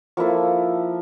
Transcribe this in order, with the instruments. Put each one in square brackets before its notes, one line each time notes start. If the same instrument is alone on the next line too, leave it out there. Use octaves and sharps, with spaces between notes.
[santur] F3 A#3 E4 A4